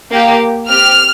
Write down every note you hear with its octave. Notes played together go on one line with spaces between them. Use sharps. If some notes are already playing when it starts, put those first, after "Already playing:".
A#3 G4
C4 G4 F6